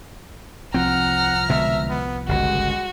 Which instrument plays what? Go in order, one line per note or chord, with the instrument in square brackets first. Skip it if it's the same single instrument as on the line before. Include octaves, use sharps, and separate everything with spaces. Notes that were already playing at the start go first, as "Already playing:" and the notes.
[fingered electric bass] C2 F3 [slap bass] C4 [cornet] F#5 [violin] A#5 F6
[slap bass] B2 D3 G#3 [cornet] E5
[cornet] B3
[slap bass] G1 C#2 [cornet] G#3 [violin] F#4